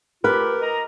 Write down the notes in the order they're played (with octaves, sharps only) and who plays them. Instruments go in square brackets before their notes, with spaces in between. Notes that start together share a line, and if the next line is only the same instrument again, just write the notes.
[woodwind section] A3 F4 G4 [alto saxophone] A#4 [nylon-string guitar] B4
[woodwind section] D#5 A#5